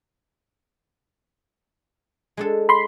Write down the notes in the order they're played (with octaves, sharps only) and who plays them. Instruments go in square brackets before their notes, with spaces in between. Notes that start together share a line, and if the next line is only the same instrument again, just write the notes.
[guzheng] G#3 D4 A4
[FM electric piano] B5 C6